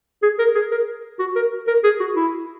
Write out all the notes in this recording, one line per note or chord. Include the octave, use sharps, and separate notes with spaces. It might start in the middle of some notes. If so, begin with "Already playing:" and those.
G#4
A#4
G#4
A#4
F#4
A#4
A#4
G#4
F#4
E4